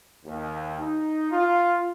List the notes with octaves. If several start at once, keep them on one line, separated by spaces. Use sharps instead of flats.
D#2
D#4
F4